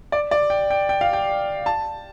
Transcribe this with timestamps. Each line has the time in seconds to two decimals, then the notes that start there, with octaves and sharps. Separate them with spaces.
0.12 D5
0.31 D5
0.50 G5
0.70 G5
0.89 G5
1.01 F5
1.13 G5
1.66 A5